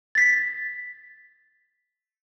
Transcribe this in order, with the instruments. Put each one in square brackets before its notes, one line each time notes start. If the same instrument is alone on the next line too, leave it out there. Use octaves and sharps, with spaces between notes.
[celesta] A6 B6